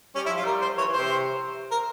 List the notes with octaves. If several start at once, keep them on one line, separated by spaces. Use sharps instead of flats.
G3 C#4
E4
F3
F4
G3 A#4
C5
E3 C#5
E3
C3 C5
A#4